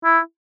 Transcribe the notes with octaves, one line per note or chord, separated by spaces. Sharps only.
E4